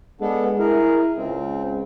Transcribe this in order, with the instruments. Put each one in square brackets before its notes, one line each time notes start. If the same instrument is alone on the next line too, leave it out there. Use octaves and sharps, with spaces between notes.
[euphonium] G#3 [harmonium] B3 D4 A4
[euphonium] E4 [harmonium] G#4 A#4
[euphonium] C#2 [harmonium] C4